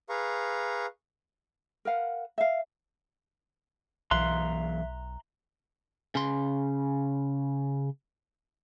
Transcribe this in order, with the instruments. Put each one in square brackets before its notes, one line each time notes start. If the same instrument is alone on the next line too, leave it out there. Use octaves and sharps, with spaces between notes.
[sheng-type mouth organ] G#4 B4 F5 A#5 C#6
[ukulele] A#4 B4 F5 F#5
E5 F5
[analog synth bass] B1 [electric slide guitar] F#2 E3 F5 [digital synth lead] E5 [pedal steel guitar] A#5 C6 F#6
[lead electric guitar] C#3 C6